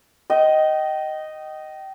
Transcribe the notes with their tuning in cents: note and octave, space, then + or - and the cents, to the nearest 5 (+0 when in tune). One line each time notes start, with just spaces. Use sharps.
D#5 +0 G5 -25